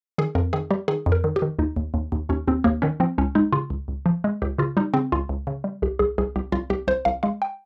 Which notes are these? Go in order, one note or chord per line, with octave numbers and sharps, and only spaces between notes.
D#3 G#4
F2 A#4
D#3 G#4
G3 G4
D#3 G#4
F2
A#4
D#3
G4
D#3
D#2 D#4
D#2
D#2
D#2
D#2 C#4
D#2 C4
D#2 A#3
D#3 C#4
F3 C4
C#2 C#4
G#3 D#4
C#3 F4
C#2
C#2
F3
G#3
C#2 G4
C#3 F4
G3 D#4
C#3 C4
C#2 F4
C#2
C#3
G3
C2 G4
C2 G#4
C2 G#4
C2 G4
C2 F4
C2 G4
C2 C5
C2 F5
G#3 F5
G5